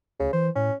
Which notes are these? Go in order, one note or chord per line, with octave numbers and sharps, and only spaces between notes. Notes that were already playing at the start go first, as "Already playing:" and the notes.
D2 C#3
E3 C5
A2 C#4